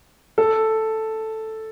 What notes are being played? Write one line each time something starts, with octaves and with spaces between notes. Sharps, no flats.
A4